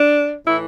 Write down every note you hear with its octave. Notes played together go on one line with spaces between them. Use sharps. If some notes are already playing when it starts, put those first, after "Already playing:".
Already playing: D4
A2 E3 E4